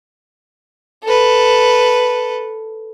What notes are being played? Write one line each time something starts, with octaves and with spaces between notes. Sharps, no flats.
A4 B4